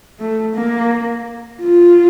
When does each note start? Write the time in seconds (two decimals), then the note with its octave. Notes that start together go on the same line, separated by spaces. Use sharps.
0.19 A3
0.55 A#3
1.62 F4